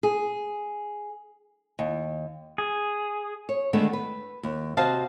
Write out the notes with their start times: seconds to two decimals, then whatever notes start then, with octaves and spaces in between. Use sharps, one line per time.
0.03 G#4
1.79 D#2
2.58 G#4
3.49 C#5
3.73 D3 D#3 G#3 A3 B3
3.93 B4
4.43 D#2
4.77 C3 F#4 C5 D#5 F5 A5